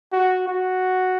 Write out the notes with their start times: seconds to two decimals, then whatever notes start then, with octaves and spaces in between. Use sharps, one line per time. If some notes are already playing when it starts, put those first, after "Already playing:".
0.13 F#4
0.48 F#4